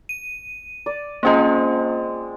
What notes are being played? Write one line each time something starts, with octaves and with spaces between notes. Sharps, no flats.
D#7
D5
G#3 A#3 C4 C#4 F4